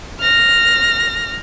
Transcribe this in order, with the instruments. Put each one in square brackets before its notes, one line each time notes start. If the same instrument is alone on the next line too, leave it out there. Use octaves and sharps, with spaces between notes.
[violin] F6 A#6